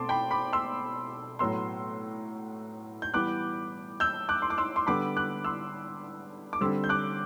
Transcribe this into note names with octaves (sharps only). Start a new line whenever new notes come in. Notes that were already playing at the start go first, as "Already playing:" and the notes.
Already playing: B2 A3 C4 A5 C6 D6
G5 B5
B5 D6
C6 E6
A2 F#3 B3 C6 E6
G6
E3 G3 B3 D6 F#6
E6 G6
D6 F#6
C6
D6
C6 E6
C6
D3 G3 B3 B5 D6
D6 F#6
C6 E6
D6
D3 G3 C4 C6 E6
G6
D6 F#6